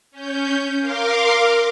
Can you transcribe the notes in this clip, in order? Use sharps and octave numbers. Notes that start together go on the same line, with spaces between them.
C#4 G6
A#4 F5 C6 D6